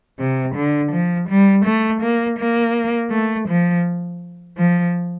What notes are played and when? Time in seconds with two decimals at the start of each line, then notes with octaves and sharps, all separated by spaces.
0.19 C3
0.55 D3
0.92 F3
1.29 G3
1.65 A3
2.01 A#3
2.38 A#3
3.11 A3
3.48 F3
4.58 F3